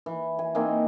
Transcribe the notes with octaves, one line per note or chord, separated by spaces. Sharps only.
E3
G#5
A#3 C4 D#4 G#5